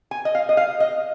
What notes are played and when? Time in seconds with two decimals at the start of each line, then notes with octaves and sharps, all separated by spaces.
0.11 G#5
0.25 D#5
0.35 F5
0.49 D#5
0.57 F5
0.80 D#5